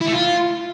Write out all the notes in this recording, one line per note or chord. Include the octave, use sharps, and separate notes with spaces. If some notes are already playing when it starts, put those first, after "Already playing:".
E4
A3
F4